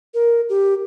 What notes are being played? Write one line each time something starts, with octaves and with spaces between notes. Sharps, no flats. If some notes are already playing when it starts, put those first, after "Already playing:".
A#4
G4